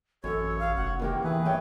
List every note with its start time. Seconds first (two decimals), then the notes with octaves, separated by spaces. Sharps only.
0.24 A1 F#2 A4 C#5
0.59 F5
0.76 F1 F#5
0.99 E2 D#3 A#3 G4
1.24 E3 E4 G#4 B4
1.45 G2 C#5 E5 G5